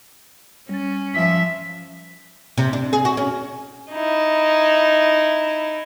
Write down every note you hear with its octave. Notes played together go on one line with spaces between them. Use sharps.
G3 C#4 A6
F3 E5 B6
C3
D4
G#4
F#4
C#4
D#4 E4